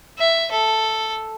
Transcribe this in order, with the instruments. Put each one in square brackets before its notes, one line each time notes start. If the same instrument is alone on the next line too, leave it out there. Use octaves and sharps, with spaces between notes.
[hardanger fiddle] E5
A4